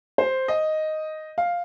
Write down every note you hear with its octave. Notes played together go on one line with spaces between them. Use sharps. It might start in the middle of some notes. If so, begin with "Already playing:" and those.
C5
D#5
F5